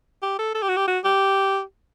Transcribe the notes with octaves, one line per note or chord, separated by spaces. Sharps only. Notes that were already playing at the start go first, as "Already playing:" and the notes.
G4
A4
A4
G4
F#4
G4
F#4
G4